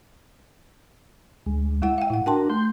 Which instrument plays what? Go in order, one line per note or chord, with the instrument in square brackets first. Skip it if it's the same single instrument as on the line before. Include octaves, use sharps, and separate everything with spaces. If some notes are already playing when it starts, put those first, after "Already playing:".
[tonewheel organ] D2 G#3
[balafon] G#3 E4 F#5 [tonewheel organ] E5
[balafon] F5 G5
[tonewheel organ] A2 [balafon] E4 F#5
[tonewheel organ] D4 F#4 A#4 [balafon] G5 A5 C6
[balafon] A3 [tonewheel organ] C6 G6